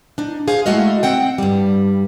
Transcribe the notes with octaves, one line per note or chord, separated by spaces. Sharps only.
D4 D#4
G#4 C5 F5
G#3 A3 E4 F#4 D#5 F5
C4 F#5 G5
G2 G3